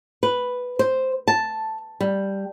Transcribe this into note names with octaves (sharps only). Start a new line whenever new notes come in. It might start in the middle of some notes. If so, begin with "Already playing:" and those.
B4
C5
A5
G3